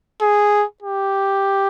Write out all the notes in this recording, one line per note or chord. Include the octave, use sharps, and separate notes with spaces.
G#4
G4